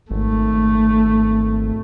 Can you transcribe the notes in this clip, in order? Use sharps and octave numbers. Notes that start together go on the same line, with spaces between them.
G#1 A3